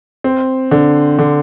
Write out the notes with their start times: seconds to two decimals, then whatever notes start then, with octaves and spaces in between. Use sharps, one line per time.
0.24 C4
0.71 D3
1.19 D3